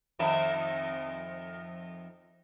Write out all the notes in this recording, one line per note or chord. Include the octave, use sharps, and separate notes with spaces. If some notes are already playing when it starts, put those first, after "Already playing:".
F2 D#3 E5